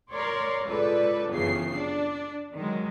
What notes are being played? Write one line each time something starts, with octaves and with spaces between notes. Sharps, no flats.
A#4 C#5 D5 C6
C#2 A4 B4 D5
G1 F#2 C#3 E3 C7
D4
D#3 F#3 G#3